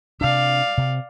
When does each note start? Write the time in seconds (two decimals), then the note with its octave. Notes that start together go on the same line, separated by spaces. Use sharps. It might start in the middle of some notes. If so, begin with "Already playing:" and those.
0.21 C3 D4 D5 F5
0.77 C3